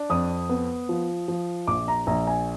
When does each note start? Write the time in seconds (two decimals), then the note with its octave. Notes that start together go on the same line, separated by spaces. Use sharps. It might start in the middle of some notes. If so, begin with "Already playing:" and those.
Already playing: D4
0.10 F2 D#6
0.49 B3
0.89 F3
1.28 F3
1.67 A#1 D6
1.88 A#5
2.07 A#1 A#5
2.27 G#5